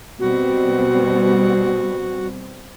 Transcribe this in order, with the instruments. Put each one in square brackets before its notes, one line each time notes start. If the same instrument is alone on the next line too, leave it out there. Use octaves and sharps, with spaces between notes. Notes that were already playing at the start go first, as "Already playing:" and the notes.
[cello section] B2 G3 C4 [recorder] F#4